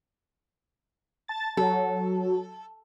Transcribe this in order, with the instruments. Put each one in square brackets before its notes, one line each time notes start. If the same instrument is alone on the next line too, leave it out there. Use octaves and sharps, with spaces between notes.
[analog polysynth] A5 A6
[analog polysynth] F#3 [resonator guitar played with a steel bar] A4